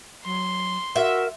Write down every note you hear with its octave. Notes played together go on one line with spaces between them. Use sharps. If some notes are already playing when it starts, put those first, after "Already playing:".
F#3 C6
F#4 A#4 E5